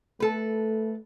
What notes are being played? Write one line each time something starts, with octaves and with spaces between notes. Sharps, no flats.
A3 A4 B4